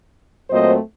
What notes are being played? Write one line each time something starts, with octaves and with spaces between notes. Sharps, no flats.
A#2 F#3 A3 C4 C5 D#5